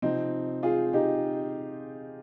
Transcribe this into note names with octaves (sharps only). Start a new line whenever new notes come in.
C3 F3 C4 D#4
F4 G#4
D#4 G4